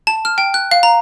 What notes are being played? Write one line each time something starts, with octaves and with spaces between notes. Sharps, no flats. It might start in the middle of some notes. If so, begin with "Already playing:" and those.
A5
F6
G5
F#6
F5
A#5